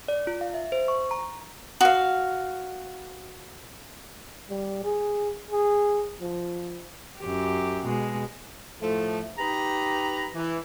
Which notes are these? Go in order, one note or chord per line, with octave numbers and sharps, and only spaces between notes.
D5
F4
F5
E5
C5
C#6
A#5
F#4 F5
G3
G#4
G#4
F3
F#2 G4
B2 G#3
A2 F3 A3
D#4 G4 B4 A#5
E3